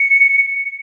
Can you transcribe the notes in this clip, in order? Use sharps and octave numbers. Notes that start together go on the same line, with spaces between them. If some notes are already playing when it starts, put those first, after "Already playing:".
Already playing: C#7